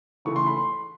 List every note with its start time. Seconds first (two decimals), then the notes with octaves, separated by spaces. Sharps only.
0.25 C#3 E3 A3 C#6
0.36 C6
0.47 B5
0.57 C6